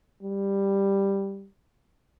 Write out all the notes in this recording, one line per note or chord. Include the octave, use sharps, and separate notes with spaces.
G3